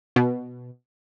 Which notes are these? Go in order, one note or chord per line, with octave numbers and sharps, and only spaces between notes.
B2